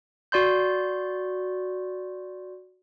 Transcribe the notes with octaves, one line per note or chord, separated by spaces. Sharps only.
F#4 D5 C6 G6